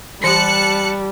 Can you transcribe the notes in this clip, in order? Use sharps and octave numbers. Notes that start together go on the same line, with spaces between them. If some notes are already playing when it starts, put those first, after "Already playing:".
E3 G3 G4 A5 F#6 C#7